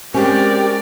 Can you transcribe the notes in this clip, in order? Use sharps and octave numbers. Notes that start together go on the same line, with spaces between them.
G#3 C4 C#4 G4 A#4 D5